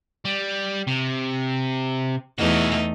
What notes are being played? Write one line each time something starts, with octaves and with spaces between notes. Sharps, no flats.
G3
C3
E2 E3 A3 D#4 F#4